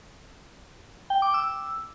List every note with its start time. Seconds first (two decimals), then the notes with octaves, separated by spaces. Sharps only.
1.10 G5
1.22 D6
1.34 E6